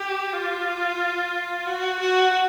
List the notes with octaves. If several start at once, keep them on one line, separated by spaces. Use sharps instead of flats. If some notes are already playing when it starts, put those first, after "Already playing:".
Already playing: G4
F4
F#4
F#4